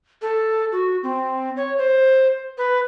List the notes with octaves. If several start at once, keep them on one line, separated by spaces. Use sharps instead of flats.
A4
F#4
C4
C#5
C5
B4